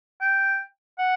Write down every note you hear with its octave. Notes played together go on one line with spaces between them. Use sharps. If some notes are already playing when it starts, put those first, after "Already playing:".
G5
F#5